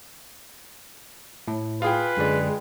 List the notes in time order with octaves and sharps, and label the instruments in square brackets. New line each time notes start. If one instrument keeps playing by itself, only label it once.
[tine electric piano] A2
[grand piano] F4 G#4 G5 [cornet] B4
[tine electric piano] F#2 D3 D5 [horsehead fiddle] G#3